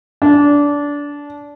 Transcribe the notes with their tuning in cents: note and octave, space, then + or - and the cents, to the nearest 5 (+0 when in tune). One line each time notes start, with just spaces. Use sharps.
D4 -20